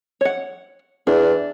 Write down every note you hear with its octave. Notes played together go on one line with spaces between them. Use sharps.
C#5 F#5
E2 D4